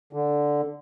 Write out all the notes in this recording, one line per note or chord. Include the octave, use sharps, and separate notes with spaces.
D3